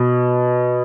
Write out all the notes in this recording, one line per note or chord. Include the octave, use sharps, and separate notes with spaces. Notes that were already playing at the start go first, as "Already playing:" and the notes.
Already playing: B2